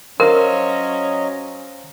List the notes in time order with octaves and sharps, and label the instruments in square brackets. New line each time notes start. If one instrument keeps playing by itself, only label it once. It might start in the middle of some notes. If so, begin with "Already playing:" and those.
[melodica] F#3 D#5 [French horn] C#4 [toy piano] A#4 [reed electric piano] C5 F5 C6